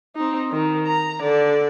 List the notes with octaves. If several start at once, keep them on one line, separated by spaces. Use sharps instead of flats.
C4 D#4
D#3
A#5
D3 D5